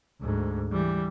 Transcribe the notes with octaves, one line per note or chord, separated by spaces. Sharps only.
D2 G#2
E3 G3